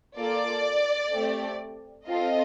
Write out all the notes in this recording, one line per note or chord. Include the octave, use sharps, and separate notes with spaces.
A#3 F4 A4 D5
A3 C4 G4
C4 F4 A4 D#5